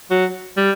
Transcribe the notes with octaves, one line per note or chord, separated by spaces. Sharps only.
F#3
G3